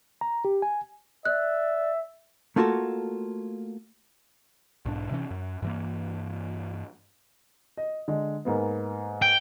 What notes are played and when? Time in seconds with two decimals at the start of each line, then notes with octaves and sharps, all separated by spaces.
0.21 A#5
0.45 G4
0.62 G#5
1.25 D5 E5 F#6
2.56 A3 A#3 F4 F#4 A4 C#5
4.86 B1 G#2 D4
5.11 C3 E3 C#4
5.31 F#2
5.62 G2 E3 A#3
7.77 D#5
8.08 D3 G#3
8.45 G#2 A#3 B3
9.22 G5